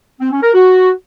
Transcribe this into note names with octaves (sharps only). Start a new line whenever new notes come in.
C4
C#4
A#4
F#4